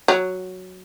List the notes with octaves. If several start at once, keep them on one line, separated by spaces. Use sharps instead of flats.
F#3